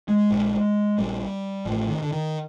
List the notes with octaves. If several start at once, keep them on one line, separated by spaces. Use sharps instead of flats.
G#3
A#1 A#2
A#1 A#2 G3
A1 A2 F3
D#3
D3
D#3